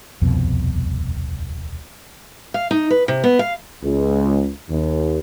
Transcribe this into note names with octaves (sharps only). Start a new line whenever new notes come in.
D#1 C2 F2 B2
F5
D#4
B4
C3
B3
F5
C#2
D#2